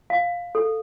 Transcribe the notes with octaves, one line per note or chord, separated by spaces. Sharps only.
F5
A4